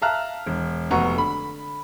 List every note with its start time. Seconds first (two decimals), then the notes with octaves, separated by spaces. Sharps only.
0.02 E5 F5 A5 A#5 F6 F#6
0.46 E1
0.91 F1 B3 F#4 A#5 C#6
1.16 D3 B5